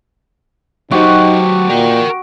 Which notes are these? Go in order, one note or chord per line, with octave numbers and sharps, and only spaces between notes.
F#3 D#4 F#4 G4 C5 F#5
A#2 A#4 G5